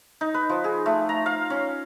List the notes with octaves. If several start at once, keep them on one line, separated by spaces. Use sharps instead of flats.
D#4
B4
F3
G#4
A3
A#5
F5
C#4